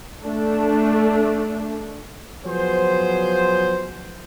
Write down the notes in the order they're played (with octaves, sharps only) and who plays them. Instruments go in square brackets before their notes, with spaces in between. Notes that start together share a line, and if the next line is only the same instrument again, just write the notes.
[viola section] A3 D4
[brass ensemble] F3 F#3 B3 G#4 C5